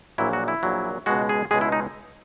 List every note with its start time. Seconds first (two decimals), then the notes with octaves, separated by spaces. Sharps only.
0.18 A#1 A#2 F#3 E4
0.33 F#4
0.48 E4
0.63 A#1 A#2 F#3
1.06 C#2 B2 G#3 F#4
1.29 G#4
1.51 C#2 B2 G#3 G#4
1.61 E4
1.72 D#4